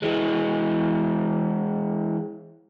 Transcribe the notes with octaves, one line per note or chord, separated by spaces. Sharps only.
E3 G#3